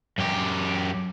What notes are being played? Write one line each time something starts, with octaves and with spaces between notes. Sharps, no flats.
F#2 G4